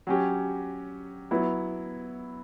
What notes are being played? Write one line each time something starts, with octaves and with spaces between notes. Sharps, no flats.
F#3 C#4 G4
F#3 B3 E4